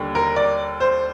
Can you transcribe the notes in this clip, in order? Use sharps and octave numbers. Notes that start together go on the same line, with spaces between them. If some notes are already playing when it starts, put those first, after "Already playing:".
Already playing: D#2 D3 G3
A#4
D5
C5